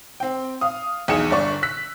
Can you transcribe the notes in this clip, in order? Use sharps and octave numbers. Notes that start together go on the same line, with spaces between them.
C4 G5
F5 D#6
B1 E2 D#4 G#4 C#7 E7
G1 D3 D5 C#6
E6 F#6 B6